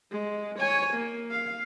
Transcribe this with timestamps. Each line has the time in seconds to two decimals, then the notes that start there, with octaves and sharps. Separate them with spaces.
0.12 G#3
0.60 C#5 G#5
0.94 A#3
1.31 F5